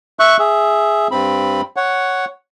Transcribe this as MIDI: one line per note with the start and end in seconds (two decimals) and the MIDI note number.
0.19 0.37 76
0.19 0.37 85
0.19 0.37 90
0.39 1.08 68
0.39 1.08 76
1.11 1.61 43
1.11 1.61 60
1.11 1.61 83
1.76 2.25 73
1.76 2.25 78